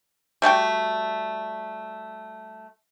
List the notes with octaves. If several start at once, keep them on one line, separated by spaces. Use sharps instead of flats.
G3 A3 F#4 G5